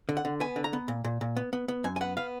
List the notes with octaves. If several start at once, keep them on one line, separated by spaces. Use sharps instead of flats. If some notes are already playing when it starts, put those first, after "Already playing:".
D3
F#5
D3
B3 G#5
D3
A#5
B3
A#2
A#2
A#2
B3
B3
B3
F#2 G#5
G#5
B3 F#5
B3 F5